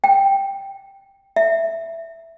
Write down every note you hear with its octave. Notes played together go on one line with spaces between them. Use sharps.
G5
E5